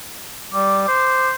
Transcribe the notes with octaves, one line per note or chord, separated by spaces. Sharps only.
G3 D6
C5